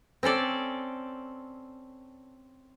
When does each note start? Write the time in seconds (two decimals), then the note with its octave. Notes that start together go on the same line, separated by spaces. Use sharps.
0.23 C4 C#4 A4 D5